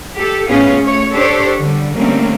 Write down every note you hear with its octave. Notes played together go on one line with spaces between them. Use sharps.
G4 A4
A2 B3 C#4 F4 G#4
A3 C#5
D4 G4 A4 C5 C#5
D3 G3
D3 G3 A3 A#3 C4 C#4